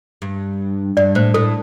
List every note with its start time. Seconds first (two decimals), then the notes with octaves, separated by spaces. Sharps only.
0.22 G2
0.97 G2 D5
1.15 A2 C5
1.34 A2 A4